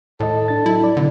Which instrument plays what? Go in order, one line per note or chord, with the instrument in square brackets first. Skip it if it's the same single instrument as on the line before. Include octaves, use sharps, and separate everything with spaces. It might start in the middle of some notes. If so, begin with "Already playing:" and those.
[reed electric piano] D#2 D#5 [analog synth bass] A2 [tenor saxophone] A4
[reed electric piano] D4 A6
[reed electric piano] F#3 [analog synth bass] E4
[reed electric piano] D5
[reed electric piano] B2 [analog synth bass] D3 [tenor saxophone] D4